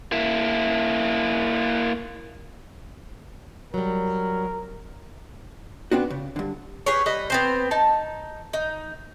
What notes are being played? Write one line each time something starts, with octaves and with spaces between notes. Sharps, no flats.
A#3 E4
F#3 G3 A#4
B3 C4 D4 F#4
C#3
G2 D3
G4 G#4 B4 C#5
G3 B4 D#5
B3 C4 C5
D#4 A5
D#4